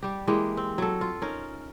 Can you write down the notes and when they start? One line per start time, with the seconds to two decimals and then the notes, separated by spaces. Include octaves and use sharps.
0.02 G3 G4
0.27 E3 G#3 A#3 G4
0.57 C4
0.78 F#3 A4
1.01 F4
1.22 C#4 D#4 A#4